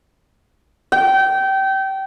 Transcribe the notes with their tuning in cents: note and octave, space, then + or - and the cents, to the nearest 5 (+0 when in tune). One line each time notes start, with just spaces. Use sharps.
G5 -25